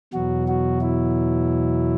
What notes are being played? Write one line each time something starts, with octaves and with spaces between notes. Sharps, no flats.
E2 B2 F#3 F#4
F#4
E4